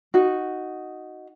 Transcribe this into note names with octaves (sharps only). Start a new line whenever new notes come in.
D#4 F#4